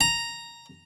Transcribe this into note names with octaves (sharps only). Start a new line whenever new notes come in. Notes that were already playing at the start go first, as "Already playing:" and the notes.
A#5